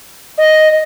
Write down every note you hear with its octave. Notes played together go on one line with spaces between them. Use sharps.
D#5